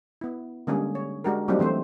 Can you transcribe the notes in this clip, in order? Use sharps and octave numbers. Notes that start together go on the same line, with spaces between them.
B3 E4
D3 G3 G#3 A#3 C#4 G#4
C#5
G#3 D4 F#4 G4 A#4
F#3 G3 A#3 C4 D4 D#4
E3 A3 C4 C5